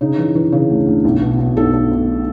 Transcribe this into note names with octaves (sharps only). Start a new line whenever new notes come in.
C#3 D#4
E3
E3
C#3
D2
D2
B1
B2
B2
B1 A4
B1
B1